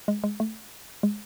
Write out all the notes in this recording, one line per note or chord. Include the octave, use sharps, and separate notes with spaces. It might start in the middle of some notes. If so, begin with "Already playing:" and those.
G#3
G#3
A3
G#3